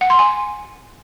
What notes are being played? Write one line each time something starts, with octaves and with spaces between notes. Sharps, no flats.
F#5
C6
G#5